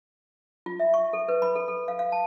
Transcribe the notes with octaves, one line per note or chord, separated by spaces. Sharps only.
F4
E5
C#6
A4
B4
B5
A4
A4
F5
F5
A5